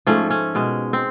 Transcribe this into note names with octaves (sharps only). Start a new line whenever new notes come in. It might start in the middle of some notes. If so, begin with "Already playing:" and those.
G#2 F3 A3 C#4
C#4
B2 G#3
C4